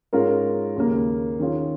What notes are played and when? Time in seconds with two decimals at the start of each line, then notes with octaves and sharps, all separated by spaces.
0.13 G#2 G#3 C#4 F4 A#4
0.77 D#2 C#3 A#3
1.39 D#3 C#4 F4 G#4